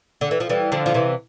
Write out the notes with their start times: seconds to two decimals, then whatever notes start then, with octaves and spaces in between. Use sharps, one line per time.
0.21 D3
0.31 E3
0.40 F3
0.49 E3 G3
0.72 D3 F3
0.86 F3
0.94 C3 E3